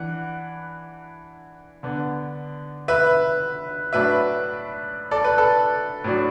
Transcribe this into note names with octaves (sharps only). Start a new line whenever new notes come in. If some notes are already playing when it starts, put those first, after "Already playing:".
Already playing: E3 D4 F#5
D3 B3 D4
B4 E5
A2 F#3 A3 D4 B4 E5
A4 D5
B4
A4
A2 F#3 D4